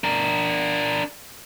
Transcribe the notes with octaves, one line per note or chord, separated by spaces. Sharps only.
D4 A#4